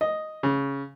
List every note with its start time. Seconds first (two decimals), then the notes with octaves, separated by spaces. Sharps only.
0.01 D#5
0.43 C#3